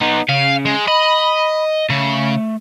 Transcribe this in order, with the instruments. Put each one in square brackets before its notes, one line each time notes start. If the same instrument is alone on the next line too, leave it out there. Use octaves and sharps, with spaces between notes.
[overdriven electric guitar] B3 D#4
[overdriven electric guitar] C#3 [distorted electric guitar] F5
[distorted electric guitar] G#3
[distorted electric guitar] D#5 [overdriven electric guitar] B5
[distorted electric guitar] C#3 [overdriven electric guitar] A3